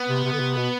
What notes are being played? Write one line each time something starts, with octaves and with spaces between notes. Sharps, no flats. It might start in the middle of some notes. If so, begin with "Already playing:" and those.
Already playing: B3
C3
C3
D3
C3
B2